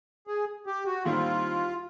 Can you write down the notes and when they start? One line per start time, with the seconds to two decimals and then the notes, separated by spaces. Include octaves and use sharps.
0.27 G#4
0.66 G4
0.86 F#4
1.05 D#2 D#3 G3 C4 E4 F4